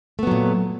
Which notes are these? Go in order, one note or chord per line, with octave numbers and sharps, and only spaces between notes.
A#2 F#3 A3 B3